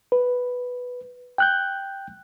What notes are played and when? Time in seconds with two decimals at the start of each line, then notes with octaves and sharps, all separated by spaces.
0.12 B4
1.38 G5 F#6 G6